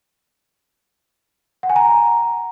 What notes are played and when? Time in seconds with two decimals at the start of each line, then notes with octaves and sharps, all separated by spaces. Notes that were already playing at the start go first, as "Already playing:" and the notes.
1.63 F#5
1.70 G#5
1.76 A#5